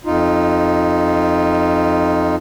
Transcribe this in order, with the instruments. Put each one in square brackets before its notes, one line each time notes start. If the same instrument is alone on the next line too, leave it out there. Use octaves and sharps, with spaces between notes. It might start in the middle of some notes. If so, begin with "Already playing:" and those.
[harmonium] F2 D#4 F4